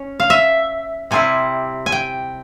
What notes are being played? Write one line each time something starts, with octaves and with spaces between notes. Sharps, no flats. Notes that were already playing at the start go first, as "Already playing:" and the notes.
Already playing: C#4
F5
E5
C3 G3 C4 E4 G#5
G#5
G5